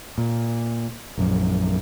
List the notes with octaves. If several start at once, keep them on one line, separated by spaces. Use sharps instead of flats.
A#2
A#1 F#2